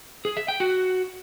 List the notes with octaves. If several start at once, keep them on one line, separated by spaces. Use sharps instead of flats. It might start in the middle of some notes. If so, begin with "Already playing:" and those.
G#4
E5
G5
F#4